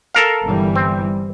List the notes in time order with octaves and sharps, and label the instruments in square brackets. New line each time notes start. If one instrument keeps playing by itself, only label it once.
[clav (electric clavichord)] A4 A#4 F5
[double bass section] G1 E3 G3
[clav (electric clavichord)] C4